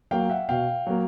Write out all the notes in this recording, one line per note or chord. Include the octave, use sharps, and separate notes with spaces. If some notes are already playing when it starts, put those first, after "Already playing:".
F#3 A#3 F5 G5
E5 F#5
B2 F5 G5
F#3 A#3